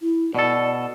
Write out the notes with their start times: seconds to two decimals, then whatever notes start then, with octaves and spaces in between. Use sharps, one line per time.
0.01 E4
0.35 B2 A4 D5